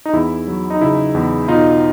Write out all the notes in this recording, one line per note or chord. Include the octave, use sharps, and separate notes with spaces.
D#4
E2 E4
F#3
D#4
C#3 E4
E2
B2 D#4 F4